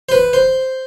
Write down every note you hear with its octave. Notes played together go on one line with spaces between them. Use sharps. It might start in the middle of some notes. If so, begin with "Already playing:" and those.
C5
B4
C5